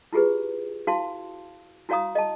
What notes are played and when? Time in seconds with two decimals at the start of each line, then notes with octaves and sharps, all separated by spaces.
0.13 E4 F4 G4 G#4 B4
0.87 E4 F#4 F5 A5 C6
1.89 E4 F#4 C#5 F5 A#5 D#6
2.15 D#5 A5